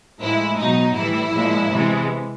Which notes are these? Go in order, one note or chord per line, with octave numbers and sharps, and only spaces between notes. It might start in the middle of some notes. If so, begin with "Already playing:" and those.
A2 F3 G#3 E4
B2 F#3 D#4
A2 E3 G3 E4
A#2 F3 G#3
C3 E3 G#3